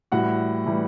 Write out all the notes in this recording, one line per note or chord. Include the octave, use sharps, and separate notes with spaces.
A2 E3 G3 F#4 F#5
A2 E3 G3